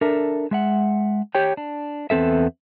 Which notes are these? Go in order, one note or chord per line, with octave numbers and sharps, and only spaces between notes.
D4 A4 A#4 E5
G#3 E5 F#5
G4 C#5 G5
D4
E2 B3 C4 A4 E5